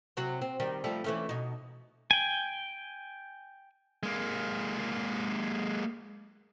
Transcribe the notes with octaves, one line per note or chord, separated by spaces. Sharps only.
C3 F#3 F#4
C4
D#3 G3
F3 G3 A3
E3 A3 C#4
B2 D#4
G5 G#5
G#3 A#3